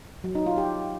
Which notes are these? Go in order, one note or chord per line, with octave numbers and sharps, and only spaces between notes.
F#3
D#4
F4
G4